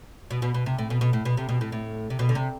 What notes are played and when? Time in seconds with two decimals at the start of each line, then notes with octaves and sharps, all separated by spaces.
0.31 B2
0.42 B2
0.54 B2
0.66 C3
0.78 A2
0.90 B2
1.01 B2
1.13 A2
1.25 B2
1.37 C3
1.49 B2
1.61 A2
1.72 A2
2.10 C3
2.19 B2
2.29 D3
2.35 C3